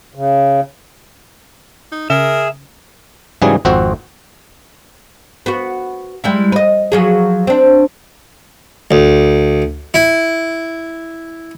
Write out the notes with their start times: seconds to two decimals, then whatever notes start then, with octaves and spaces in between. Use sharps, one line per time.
0.15 C#3
1.92 D#4
2.10 C#3 G#4 A#4 E5
3.42 G#2 C#3 E3 F#3 G3 G#4
3.65 G#1 F2 C4 F#4 C5 F#5
5.46 B3 F#4
6.24 G3 G#3 E4
6.52 B4 D#5
6.92 F3 F#3 G#4
7.47 C4 D4
8.91 D2
9.94 E4